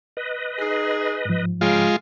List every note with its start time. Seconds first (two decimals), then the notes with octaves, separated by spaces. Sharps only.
0.17 B4 D#5
0.58 D#4 G#4
1.25 G#2 F3
1.61 C#3 G#3 F4 F5 G5 F6